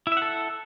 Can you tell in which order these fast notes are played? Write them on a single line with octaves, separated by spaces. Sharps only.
E4 E5 F#5 A4